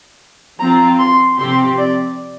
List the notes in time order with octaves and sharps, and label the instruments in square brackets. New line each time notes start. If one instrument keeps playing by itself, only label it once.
[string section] F3 C4 F4 [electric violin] A#5
[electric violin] C6
[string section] C3 F3 C4 G4 [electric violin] C6
[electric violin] D5